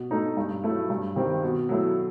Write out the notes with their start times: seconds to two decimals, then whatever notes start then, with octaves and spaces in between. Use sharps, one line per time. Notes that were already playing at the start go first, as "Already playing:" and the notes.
Already playing: B2
0.11 A3 D#4
0.37 G2
0.64 F#3 A3 E4
0.90 G2
1.16 D#3 G3 C4
1.43 B2
1.69 F#3 A3 E4